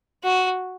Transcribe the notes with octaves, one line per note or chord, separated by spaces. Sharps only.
F#4